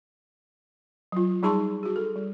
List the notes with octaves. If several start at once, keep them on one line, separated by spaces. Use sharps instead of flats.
F#3 F4
G3 D#4 G#4 A5 C6 C#6
F#4 G#4
A4
G3